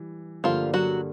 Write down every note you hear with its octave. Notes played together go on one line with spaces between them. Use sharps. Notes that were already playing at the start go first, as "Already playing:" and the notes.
Already playing: E3 G3
G2 D3 F3 G3 A#3 F4
F#3 F#4